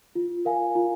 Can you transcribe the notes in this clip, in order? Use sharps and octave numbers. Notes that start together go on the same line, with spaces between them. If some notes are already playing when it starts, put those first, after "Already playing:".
F4
A#4 F5 G#5
F4